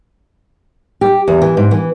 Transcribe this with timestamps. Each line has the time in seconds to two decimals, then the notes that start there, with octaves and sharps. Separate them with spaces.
1.01 G4
1.28 E2
1.42 E3
1.57 G#2
1.71 E3